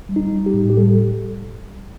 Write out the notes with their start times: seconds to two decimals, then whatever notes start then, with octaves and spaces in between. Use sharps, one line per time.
0.09 G3
0.16 D#4
0.32 G3
0.46 G4
0.54 A2
0.70 G4
0.77 G3 A4